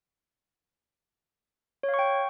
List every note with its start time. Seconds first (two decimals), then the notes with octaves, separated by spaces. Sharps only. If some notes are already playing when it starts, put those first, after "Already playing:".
1.83 C#5
1.89 F5
1.94 C#6
1.99 G5